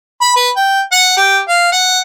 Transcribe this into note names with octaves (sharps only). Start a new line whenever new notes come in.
B5
B4
G5
F#5
G4
F5
F#5